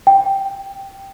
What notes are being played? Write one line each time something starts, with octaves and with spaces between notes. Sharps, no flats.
G5